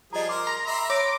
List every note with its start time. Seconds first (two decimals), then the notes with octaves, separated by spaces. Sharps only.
0.13 F3 G3 G#4 D#5 A#5
0.29 A#4 C6 D6
0.47 A#5
0.66 E5 B5 C6
0.90 C#5 D6 A#6